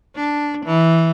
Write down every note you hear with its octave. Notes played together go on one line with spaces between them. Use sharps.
D4
E3